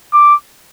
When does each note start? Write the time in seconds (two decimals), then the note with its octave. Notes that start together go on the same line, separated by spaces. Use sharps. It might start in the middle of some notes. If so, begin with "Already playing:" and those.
0.13 D6